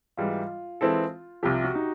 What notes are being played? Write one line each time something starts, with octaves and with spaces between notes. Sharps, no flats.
G#2 E3 G3 F4
E3 G#3 C4 E4 A4
C2 C3 F3 G4
F#4
D#4